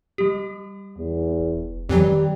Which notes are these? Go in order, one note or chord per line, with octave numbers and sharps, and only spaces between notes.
G3 G4
E2
F1
F2 D#3 E3 F#3 G3